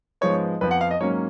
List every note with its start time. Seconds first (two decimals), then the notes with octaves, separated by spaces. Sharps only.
0.21 G#2 F3 G#3 B3 C#5
0.61 F2 F3 B3 B4
0.71 F#5
0.81 F5
0.91 D#5
1.00 G#2 F#3 A#3 C#4 C#5